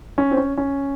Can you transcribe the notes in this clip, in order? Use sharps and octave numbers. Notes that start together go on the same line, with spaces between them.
C#4
C4
C#4
C#4